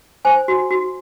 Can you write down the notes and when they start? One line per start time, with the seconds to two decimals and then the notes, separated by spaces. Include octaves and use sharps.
0.25 C5 G#5
0.48 F#4
0.71 F#4